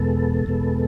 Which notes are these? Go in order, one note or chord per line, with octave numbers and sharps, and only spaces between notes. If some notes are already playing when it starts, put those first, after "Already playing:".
Already playing: E2 B2 G#3 B3 A4
E2 B2 G#3 B3